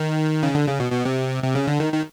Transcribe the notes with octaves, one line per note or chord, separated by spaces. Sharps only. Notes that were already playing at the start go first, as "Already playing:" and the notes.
Already playing: D#3
C#3
D3
C#3
B2
B2
C3
C3
C#3
D3
D#3
D#3